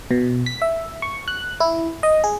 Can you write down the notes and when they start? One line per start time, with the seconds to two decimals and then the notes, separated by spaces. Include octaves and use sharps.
0.11 B2
0.46 B6
0.62 E5
1.02 C#6
1.28 F#6
1.60 E4
2.03 D#5
2.24 G#4